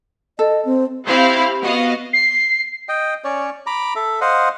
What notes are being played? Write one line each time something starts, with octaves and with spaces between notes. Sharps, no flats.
A4 D#5
C4
C4 E4 G4 C5 F5
B3 F#4 D#5 F5
C7
D#5 G5
C#4 C#5 D5
A#5 B5 D6
A4 E5
C5 D#5 F5 F#5